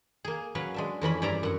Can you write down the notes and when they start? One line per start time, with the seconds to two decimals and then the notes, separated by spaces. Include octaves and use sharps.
0.24 A#3 G#4
0.55 F#3 C#4 B4 F5
0.74 G#3 D4 E5
1.01 F2 E3 C#4 B5
1.22 G2 C#4 D5 E5 A#5 C6
1.43 F#2 F#5